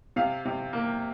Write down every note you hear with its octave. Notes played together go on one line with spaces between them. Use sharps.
C3 F5
C3
A#3